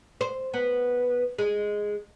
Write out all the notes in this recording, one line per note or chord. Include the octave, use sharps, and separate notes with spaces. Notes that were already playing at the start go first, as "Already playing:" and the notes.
C5
B3
G#3